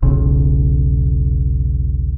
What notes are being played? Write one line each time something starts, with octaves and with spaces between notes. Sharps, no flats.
E1 B1 C#3